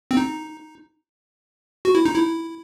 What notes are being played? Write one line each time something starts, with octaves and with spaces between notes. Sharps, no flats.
C4
D#4
F#4
E4
D#4
E4